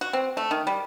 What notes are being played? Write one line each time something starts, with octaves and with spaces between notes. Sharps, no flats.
F#4
C4
A3
D#3
G3